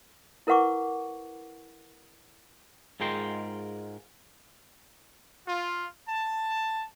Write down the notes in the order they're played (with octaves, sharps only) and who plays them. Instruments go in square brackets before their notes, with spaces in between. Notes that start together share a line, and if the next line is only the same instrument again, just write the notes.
[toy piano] E4 A#4 B4 F#5 C#6 D6
[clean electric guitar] G#2 G#3 F4 A#4 G5 C6
[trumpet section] F4
A5